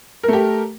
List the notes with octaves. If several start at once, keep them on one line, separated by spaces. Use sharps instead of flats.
A3 G4 A#4